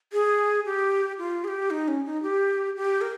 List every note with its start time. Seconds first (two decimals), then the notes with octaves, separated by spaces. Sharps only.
0.13 G#4
0.66 G4
1.18 F4
1.44 G#4
1.48 G4
1.71 D#4
1.88 C#4
2.05 D#4
2.23 G4
2.76 G4
3.01 A#4